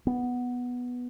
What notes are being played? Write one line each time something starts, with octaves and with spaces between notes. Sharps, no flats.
B3